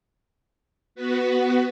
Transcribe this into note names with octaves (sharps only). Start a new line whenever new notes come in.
B3 F#4 B4